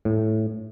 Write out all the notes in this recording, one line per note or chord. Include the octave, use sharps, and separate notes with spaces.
A2